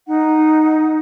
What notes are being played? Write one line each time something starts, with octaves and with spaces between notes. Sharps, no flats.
D#4 F#5